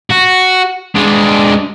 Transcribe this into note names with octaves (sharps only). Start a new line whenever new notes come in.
F#4
G#3 D4